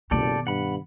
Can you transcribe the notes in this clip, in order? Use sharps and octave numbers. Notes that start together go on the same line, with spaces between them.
F#1 B2 D#3 G4 A4 D5
G2 F#5 B5